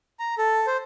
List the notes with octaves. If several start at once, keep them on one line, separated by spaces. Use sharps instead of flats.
A#5
A4
C5